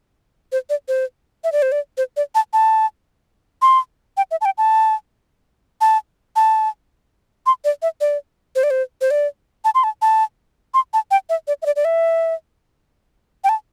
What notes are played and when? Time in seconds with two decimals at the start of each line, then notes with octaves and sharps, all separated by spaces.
0.52 C5
0.70 D5
0.88 C5
1.44 E5
1.52 D5
1.62 C5
1.72 D5
1.97 C5
2.17 D5
2.35 A5
2.53 A5
3.62 C6
4.17 G5
4.31 E5
4.41 A5
4.45 G5
4.58 A5
5.81 A5
6.36 A5
7.46 C6
7.65 D5
7.82 E5
8.01 D5
8.55 C5
8.63 D5
8.70 C5
9.01 C5
9.11 D5
9.65 A5
9.75 C6
9.84 A5
10.02 A5
10.74 C6
10.94 A5
11.11 G5
11.29 E5
11.48 D5
11.62 E5
11.66 D5
11.76 D5
11.85 E5
13.44 G5
13.49 A5